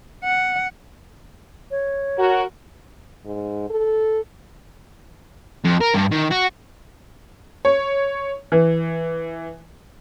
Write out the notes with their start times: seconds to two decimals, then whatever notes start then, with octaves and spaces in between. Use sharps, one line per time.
0.25 F#5
1.71 C#5
2.19 F#4 A#4
3.25 G#2
3.70 A4
5.64 F2
5.81 A#4
5.94 G2
6.11 D#3
6.31 F#4
7.65 C#5
8.52 E3